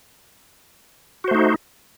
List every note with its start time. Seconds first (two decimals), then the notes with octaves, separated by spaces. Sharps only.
1.24 F#4
1.28 C5
1.31 A3
1.35 D#4